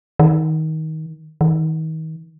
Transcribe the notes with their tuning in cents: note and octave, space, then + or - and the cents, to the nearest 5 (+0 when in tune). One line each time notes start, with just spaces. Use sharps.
D#3 +20
D#3 +35